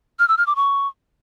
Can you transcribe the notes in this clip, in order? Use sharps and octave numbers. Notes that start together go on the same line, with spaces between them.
F6
E6
F6
D6
C#6